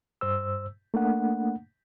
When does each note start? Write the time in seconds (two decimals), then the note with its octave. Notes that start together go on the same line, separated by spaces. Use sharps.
0.21 G2 C5 E6
0.94 A3 A#3 D4 F#5